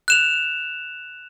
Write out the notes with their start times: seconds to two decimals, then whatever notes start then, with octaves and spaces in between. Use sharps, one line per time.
0.08 F#6 E7 F7